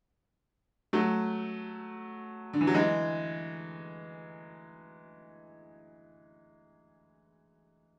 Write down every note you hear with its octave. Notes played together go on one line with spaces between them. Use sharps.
F#3 A3
D3
E3
F#3
E3 G#3